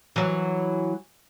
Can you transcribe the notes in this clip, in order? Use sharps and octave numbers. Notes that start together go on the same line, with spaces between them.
E3 F#3